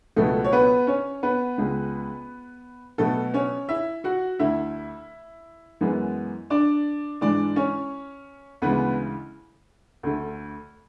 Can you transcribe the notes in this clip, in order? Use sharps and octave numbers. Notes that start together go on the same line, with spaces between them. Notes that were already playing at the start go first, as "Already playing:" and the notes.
C#2 B2 F#3 A3 B3 A4
C#5
B3 B4
C#4 C#5
B3 B4
C#2 C#3 G#3
B2 F#3 A3 B3 A4
C#4 C#5
E4 E5
F#4 F#5
D2 D3 A3 E4 E5
F#2 E3 G#3 B3
D4 D5
G#2 E3 G#3 D4 D5
C#4 C#5
D2 C#3 E3 G#3 B3 B4
D2 D3 A3